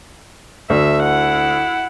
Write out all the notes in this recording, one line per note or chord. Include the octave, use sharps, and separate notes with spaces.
D2 E5
E4 F#5